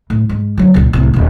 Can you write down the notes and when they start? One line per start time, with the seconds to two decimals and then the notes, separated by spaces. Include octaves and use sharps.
0.10 A2
0.29 G#2
0.57 D3 F#3
0.74 C#2 A#2
0.93 C2 A2
1.14 D#1 D#2